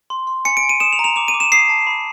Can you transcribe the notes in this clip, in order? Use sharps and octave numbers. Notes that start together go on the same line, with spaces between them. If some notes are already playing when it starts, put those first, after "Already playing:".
C6
C6
G#5 C#7
D7
G#5
D#7
D#6 E7
F7
A#5
F7
D6 F7
D#7
D6
E7
D#6 C7
A5
B5